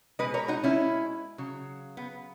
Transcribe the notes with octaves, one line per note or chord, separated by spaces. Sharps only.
B2 G#3 B4 D#5
A#4 C#5
D#4 F#4
C#4 E4
C#3 F#3
B3